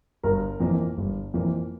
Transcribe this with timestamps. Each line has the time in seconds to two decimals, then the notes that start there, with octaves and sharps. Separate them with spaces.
0.23 G1 A#4
0.60 F2 E3 A#3
0.98 G1
1.34 F2 E3 A#3